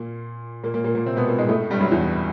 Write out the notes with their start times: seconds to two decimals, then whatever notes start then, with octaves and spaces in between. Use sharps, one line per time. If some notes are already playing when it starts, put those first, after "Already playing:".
Already playing: A#2 A#3
0.64 A#2 A#3
0.74 A#2 A#3
0.84 A#2 A#3
0.95 A#2 A#3
1.06 C3 C4
1.17 B2 B3
1.28 A#2 A#3
1.38 G#2 G#3
1.49 A2 A3
1.70 G2 G3
1.81 F#2 F#3
1.91 E2 E3